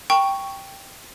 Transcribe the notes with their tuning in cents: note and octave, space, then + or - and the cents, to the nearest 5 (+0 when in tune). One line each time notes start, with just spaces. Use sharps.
G5 +0 A#5 +0 C#6 +0